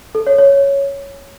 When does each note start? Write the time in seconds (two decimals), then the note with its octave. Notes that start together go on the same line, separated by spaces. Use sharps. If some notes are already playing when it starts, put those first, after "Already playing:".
0.15 A4
0.27 C#5
0.38 C#5